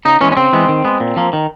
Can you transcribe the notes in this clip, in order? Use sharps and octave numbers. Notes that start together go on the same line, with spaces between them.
C#3 D#4
E3 G#3 B3 C#4
C#4
C#3 C4
E3 G#3 B3
D#3
G#3 B3
A#2
F3 A#3
D#3